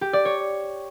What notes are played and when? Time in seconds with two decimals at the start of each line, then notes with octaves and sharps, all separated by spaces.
0.01 G4
0.13 D5
0.25 C#5